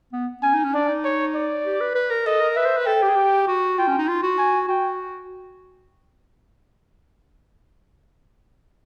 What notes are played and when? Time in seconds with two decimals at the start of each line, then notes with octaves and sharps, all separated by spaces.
0.13 B3
0.43 C#4 G#5
0.54 D#4
0.64 C#4
0.74 D4 D5
0.88 D#4
1.04 C#5
1.35 D5
1.65 G4
1.81 B4
1.95 B4
2.10 A#4
2.26 A4 D#5
2.41 A#4
2.56 B4 E5
2.66 C5
2.77 B4
2.86 A4 G5
3.02 G4
3.09 G#4
3.15 G4
3.47 F#4
3.78 F4 G5
3.87 C#4
3.98 D#4
4.08 F4
4.23 F#4
4.38 G#5
4.69 F#4 G5